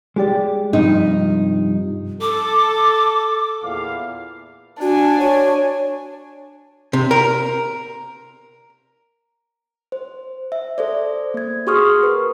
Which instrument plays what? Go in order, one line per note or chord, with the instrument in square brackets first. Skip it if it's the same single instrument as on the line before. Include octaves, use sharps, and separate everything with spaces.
[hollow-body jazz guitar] G#3 G4 D5
[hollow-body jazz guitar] G2 C3 F3 [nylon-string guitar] D#4
[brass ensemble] A4 [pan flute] D6
[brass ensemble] E2 A#2 F5
[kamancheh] D4 G#5 [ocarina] F#4
[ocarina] C#5
[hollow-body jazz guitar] C3
A#4
[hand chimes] C5
E5
A4 C5 D5
A#3 G#6
F#4 G#4 C6 C#6 D#6 F6
A#4 B4